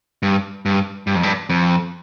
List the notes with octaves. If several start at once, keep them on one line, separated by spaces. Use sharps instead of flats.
G2
G2
G2
F2
G2
F2